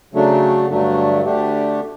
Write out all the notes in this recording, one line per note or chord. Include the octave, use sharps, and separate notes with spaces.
C#3 F#3 A3 D4
G2 D3 F#3 A3 D4
D2 D3 A3 D4 G4